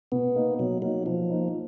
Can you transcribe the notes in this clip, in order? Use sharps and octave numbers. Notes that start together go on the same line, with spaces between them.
B2 B3
A#3 D#4
B2 F#3
F#3 A#3 D#4
B2 F3
A#3 D#4